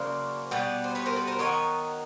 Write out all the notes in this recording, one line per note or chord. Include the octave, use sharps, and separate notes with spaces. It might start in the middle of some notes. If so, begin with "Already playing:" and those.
Already playing: C#3 F#3 A#3 C5 D5
B2 G3 B3 D5
C5
B4 C#5
A#4 C5
A4 B4
A#4 C5
D#3 F#3 B3 C#5 D#5